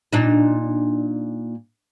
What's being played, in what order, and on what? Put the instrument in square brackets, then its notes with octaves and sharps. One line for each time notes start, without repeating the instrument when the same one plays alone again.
[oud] A#2 D4 D#4